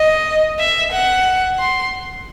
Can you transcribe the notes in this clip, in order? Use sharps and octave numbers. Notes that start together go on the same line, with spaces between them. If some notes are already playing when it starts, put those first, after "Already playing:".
Already playing: D#5
E5
F#5
C6